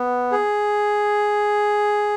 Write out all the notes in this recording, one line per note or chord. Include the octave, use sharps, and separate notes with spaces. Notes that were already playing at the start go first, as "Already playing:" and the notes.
Already playing: B3
G#4